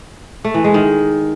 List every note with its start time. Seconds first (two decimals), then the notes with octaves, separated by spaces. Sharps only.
0.44 A3
0.54 E3
0.64 G#3
0.74 D#3